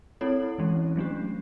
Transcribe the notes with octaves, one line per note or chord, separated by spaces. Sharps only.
C4 E4 A4 C#5
E3 G#3 C#4
F#3 A3 D4 G4